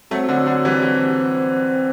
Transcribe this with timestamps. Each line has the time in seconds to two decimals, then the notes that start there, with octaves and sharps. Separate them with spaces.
0.11 F#3 A3 C4
0.29 D3 F#3
0.46 D3 F#3
0.65 E3 G3
0.82 E3 G3